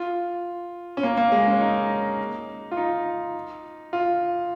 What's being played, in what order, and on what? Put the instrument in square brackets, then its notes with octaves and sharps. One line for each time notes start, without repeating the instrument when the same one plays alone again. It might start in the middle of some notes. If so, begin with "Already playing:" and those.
Already playing: [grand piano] F4
C#4
A#3
A#3
G#3
C#4
D#4
F4
D#4
F4